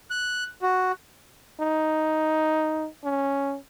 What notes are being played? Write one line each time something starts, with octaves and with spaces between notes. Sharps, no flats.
F#6
F#4
D#4
C#4